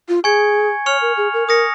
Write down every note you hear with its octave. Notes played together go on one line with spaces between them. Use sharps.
F4
G#4 G#5 C#6 G#6 C#7
C#5 C#6 F6 C#7 F7
A#4
G#4
A#4
A#4 D#6 A#6 C#7